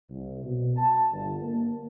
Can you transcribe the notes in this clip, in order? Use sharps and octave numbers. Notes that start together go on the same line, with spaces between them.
C2
B2
A5
G1
A#3